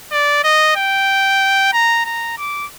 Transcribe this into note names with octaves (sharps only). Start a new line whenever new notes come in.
D5
D#5
G5
A#5
A#5
D6